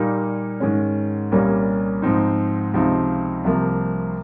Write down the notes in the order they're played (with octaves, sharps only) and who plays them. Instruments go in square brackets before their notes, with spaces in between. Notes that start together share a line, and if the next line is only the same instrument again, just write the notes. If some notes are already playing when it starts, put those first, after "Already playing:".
Already playing: [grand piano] A#2 G3 A#3 D#4
G#2 D#3 G#3 C#4
C2 A#2 G3 A#3 C#4
G#2 F3 C4 D#4
C#2 C3 F3 C4 D#4
C2 C3 F3 A#3